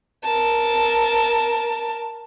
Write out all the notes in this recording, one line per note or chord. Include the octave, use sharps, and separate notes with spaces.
A#4 A5